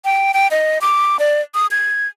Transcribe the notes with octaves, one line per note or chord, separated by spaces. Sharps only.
G5
G5
D#5
D6
D5
D#6
G#6